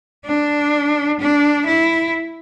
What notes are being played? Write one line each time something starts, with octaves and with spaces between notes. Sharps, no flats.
D4
D4
E4